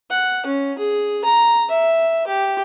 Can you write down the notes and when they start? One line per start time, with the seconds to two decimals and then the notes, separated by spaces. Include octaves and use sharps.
0.10 F#5
0.46 C#4
0.78 G#4
1.25 A#5
1.69 E5
2.27 G4